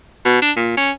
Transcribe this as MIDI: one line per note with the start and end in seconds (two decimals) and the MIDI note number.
0.25 0.41 47
0.42 0.51 62
0.56 0.73 46
0.77 0.91 61